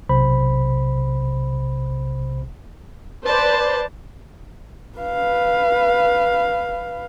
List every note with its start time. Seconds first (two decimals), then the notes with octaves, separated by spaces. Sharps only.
0.09 B1 C3 C5 B5
3.26 B4 C5 D5 A5
4.98 B4 F5